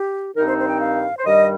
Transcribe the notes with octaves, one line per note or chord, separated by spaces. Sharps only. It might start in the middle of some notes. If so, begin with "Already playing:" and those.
Already playing: G4
G2 D#3 C4 D#4 A#4
C5
C5
G5
F5
C5
G2 D#3 G3 D#5